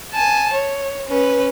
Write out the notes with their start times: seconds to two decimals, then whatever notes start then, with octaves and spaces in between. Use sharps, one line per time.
0.14 G#5 A5
0.53 C#5
1.08 C#4 B4